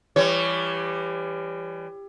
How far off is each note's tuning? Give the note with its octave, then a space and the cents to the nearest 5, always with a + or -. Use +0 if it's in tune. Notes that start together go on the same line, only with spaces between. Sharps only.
E3 +40 G3 +20 C#5 +15